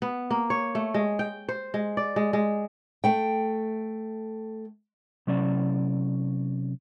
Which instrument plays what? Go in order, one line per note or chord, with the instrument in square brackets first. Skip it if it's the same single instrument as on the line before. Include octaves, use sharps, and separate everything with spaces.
[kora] B3
A#3
C#5
A3
G#3
G5
C5
G#3
D5
G#3
G#3
[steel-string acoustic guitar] A3 G5
[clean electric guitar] C3 F#3 C#4 D5